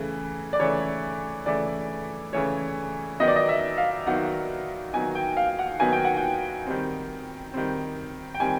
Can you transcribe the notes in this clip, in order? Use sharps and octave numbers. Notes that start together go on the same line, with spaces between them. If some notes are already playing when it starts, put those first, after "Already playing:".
Already playing: C#3 E3 A3
D5
C#3 E3 A3 C#5
C#3 E3 A3 D5
C#3 E3 A3 C#5
D#3 F#3 B3 D#4 D#5
D5
D#5
E5
F5
D#3 F#3 B3 D#4 F#5
D#3 F#3 B3 D#4 G#5
G5
F5
F#5
D#3 F#3 B3 D#4 G#5
G5
F#5
G5
D#3 G3 C4
D#3 G3 C4
G5
D#3 G3 C4 G#5